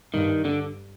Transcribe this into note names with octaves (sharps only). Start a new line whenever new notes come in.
G2 D#3
D3